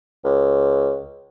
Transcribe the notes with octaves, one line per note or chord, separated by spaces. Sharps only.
C#2